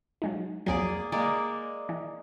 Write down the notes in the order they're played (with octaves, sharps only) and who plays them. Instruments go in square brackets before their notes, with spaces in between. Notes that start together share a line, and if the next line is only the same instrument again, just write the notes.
[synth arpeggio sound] F#3 G#3 D#4
[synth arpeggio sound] C2 F2 F#3 [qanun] A#3 G#4 D5
[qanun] G#3 A#3 D5
[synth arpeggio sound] E3